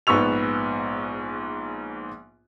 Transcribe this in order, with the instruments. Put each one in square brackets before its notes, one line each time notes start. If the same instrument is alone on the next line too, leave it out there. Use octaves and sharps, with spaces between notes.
[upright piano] A#1 G#2 B3 C#6 E6 F7